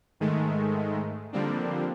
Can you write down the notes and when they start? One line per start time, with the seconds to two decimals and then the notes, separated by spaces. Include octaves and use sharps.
0.20 G#2 D#3 G#3 A3
1.33 D3 F3 G3 A#3 C4 D4